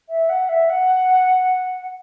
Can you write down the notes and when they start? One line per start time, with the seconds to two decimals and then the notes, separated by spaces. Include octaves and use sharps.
0.09 E5
0.29 F#5
0.49 E5
0.69 F#5